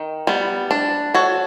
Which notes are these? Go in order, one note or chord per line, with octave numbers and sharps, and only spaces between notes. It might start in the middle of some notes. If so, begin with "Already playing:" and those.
Already playing: D#3
G3 B3
D4
F#4 A4 C#5